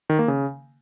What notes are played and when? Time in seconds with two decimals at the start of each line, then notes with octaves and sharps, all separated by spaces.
0.10 D#3
0.19 A#3
0.28 C#3